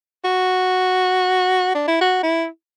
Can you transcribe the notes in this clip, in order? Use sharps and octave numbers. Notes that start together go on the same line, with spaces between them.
F#4
D4
E4
F#4
E4